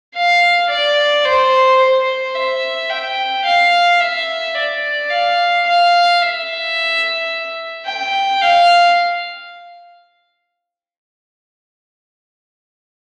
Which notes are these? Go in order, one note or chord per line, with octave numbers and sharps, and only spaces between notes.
F5
D5
C5
C5
E5
G5
F5
E5
D5
F5
F5
E5
G5
F5